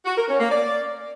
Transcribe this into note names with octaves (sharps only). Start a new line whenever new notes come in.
F#4
A#4
C#4
A#3
D5